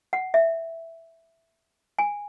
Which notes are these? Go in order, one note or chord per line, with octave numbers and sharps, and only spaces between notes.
F#5
E5
G#5